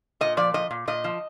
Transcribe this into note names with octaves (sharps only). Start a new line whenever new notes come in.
A#2 D#5
F3 D5
F3 D#5
A#2
A#2 D#5
F3